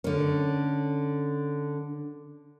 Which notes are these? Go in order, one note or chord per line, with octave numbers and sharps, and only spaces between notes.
D3 C#4